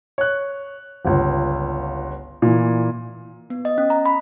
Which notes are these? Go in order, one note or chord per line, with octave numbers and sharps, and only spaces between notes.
C#5 F#6
G1 C#2
A#2 E3
B3
D#5
C#4
A#5
B5